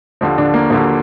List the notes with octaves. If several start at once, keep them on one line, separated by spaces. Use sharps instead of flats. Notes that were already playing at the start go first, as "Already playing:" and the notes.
D#2 D3 F3
D3 D4
A#3
D#2 D3 F3 A#3